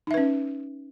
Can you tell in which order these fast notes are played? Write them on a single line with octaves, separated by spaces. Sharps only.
D#4 E5 B4 C#4